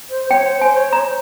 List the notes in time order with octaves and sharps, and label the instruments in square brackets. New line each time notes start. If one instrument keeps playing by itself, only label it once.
[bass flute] C5
[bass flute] C#5 [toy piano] G5
[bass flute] C5
[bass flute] C5 [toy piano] G#5
[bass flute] C#5
[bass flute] C5 [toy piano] A#5